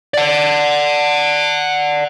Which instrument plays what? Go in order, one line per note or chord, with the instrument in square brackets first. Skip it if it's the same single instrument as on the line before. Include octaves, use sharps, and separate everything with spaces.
[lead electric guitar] D5 F#5